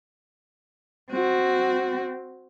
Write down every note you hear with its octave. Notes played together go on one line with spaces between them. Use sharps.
C4 F#4